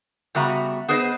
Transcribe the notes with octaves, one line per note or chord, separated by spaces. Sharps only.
C#3 G3 B3 F#4 E5 A#5
B3 G#4 B4 C5 D#5